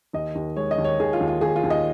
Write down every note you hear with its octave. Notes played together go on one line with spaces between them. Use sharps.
D#2 D#5
D#2
G#3 C#5
D#5
D#2
C#5
D#2 G#4
F4
D#2
F4
D#2 G#4
F4
D#2
D#5